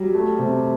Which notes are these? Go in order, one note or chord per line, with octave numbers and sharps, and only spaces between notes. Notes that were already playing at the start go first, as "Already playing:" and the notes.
Already playing: F#3 G3
A3
C3